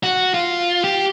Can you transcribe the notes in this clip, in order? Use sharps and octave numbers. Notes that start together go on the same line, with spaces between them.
F#4
F4
G4